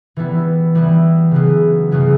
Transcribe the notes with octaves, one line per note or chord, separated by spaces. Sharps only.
E3 G3 B3 E4
E3 G3 B3 E4
C#3 F#3 B3 E4
C#3 F#3 B3 E4